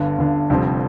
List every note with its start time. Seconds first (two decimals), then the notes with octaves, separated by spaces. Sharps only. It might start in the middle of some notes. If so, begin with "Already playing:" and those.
Already playing: G1 G2 D3
0.18 G1 G2 D3
0.50 F1 F2 D3 G3 C4